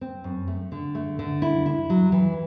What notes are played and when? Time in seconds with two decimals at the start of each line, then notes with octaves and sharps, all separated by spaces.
0.01 C4
0.24 F#2
0.48 A3
0.72 D3
0.95 A3
1.19 D3
1.42 E4
1.66 E4
1.90 F#3
2.12 E3